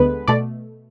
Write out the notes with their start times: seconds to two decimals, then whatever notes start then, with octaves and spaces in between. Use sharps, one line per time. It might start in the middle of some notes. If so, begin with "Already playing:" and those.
Already playing: D2 D3 G#3 B3 B4
0.27 B2 A3 D5